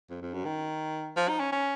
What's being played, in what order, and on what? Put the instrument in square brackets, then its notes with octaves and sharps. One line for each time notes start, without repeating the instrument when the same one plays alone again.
[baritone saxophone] F2
F2
F#2
D#3
F3
D#4
C#4
C#4